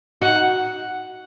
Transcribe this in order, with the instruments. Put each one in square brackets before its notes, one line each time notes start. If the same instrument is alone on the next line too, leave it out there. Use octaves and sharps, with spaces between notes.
[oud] D#4 F#4 [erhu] F#5